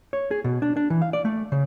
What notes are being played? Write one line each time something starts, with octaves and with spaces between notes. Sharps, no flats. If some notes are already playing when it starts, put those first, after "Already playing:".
C#5
G#4
B2
D4
D4
E3
F5
D5
A3
C#3